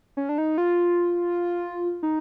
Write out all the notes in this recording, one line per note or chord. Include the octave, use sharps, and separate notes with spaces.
C#4
D4
D#4
F4
D#4